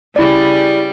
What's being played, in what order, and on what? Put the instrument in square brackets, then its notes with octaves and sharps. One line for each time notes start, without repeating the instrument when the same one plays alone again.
[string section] C#3 G3 [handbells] E4 D5